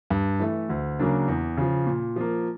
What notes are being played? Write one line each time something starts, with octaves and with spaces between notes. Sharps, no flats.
G2
E3 A3
D2
C#3 F#3 A#3 D4
E2
C#3 F3
A#2
F3 A#3